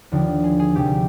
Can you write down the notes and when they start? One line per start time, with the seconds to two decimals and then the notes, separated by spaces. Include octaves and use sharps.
0.12 D#2 D3 F3
0.44 G#4
0.60 G#4
0.75 D2 C3 F3 G4